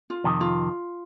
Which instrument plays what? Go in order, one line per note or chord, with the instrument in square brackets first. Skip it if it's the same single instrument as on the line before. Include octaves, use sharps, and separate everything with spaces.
[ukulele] F4
[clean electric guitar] F2 C3 D#3
[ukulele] F4